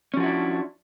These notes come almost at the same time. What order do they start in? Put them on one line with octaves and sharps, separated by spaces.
C#4 F3 F#4 E4 D4